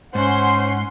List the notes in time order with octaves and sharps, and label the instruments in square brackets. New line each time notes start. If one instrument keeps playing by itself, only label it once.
[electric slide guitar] G#2 [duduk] C#4 [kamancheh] C5 [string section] F#5 G#5 C6